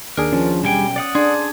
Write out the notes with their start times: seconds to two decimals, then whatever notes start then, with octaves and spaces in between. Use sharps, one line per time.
0.17 D#2 D4 G#4 A#4
0.33 F3 C#4
0.64 B1 G3 G5 G#5
0.96 D5 F#5 D#6
1.15 D4 G#4 C6